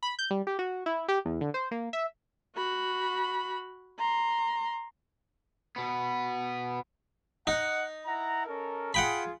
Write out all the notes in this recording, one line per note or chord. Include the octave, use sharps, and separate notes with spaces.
B5
G6
G3
G4
F#4
E4
G4
E2
D3
C5
A#3
E5
F#4 B5
A#5 C6
B2 B3
D#4 D#5 F#5
E4 F#5 A#5
C#4 A4 A#4
F4 G#4 F#5 G5 B5